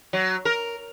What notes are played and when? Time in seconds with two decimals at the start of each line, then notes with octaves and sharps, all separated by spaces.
0.13 F#3
0.45 A#4